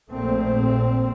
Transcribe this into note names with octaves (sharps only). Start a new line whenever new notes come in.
A#1 A#2 A3 C4